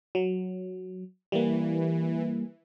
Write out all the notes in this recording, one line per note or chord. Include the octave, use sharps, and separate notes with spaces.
F#3
E3 G3 A#3